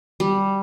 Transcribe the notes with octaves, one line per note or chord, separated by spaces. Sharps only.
G3